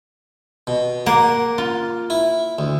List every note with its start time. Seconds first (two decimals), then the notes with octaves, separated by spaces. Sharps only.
0.67 B2
1.06 A#3 F#5
1.58 F4
2.10 E4
2.59 D2